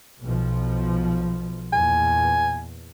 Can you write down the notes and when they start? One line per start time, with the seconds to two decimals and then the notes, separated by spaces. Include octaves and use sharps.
0.21 B1 B2 F3
1.73 E2 A#2 G#5